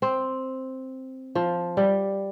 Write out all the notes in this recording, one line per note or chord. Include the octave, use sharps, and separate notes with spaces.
C4
F3
G3